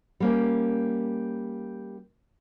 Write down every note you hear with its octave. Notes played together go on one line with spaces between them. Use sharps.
G3 A#3 C#4